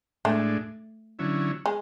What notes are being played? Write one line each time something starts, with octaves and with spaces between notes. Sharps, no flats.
A2 G#3 A3 D4
D3 F#3 C#4 E4
G#3